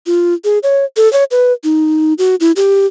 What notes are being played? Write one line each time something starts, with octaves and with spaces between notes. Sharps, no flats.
F4
G#4
C#5
A4
C#5
B4
D#4
F#4
E4
G4